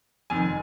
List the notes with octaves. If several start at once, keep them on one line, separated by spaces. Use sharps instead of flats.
F1 F2 D#3 G#5